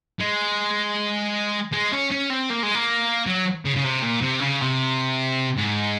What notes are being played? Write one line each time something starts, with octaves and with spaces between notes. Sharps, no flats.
G#3
G#3
C#4
C#4
C4
A#3
G#3
A#3
F#3
C#3
C#3
C3
A#2
C3
C#3
C3
G#2